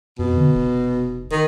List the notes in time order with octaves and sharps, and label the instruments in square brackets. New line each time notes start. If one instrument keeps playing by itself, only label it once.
[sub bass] F2 [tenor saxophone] B2
[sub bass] D3
F1
[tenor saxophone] D#3